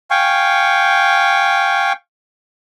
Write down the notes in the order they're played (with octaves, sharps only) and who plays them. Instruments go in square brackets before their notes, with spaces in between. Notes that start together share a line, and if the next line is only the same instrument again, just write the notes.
[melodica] F5 G5 G#5 C#6